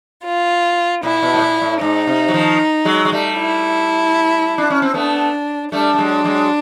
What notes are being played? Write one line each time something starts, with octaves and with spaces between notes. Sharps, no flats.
F4
A#2 E4
B2
A2
A#2
A2
G#2 D#4
C3
F#3
D#3 F3
F#3 G#3
G#3
G3 A3
E4
D4
C#4
C4
A3 B3 D4
G3 A3 D4
A3
F#3 G#3
F#3 G#3